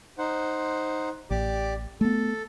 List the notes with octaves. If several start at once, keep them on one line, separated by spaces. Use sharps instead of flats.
D#4 C5 F#5
A1 G4 D5 D6
A3 B3 A4